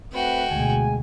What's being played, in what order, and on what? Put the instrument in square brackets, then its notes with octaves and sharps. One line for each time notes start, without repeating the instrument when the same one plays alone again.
[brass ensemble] A3 C4 B4 [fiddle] F#4 G5
[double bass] D2 B2 [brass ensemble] G#3 G#5